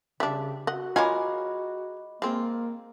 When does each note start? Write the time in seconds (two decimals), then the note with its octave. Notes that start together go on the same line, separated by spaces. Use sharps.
0.20 C#3 G3 D4 E5
0.67 F#4 D#5 F#5
0.96 G#3 F4 A#4 C#5 D#5 G#5 B5 D6
2.22 G#3 A#3 C4 F4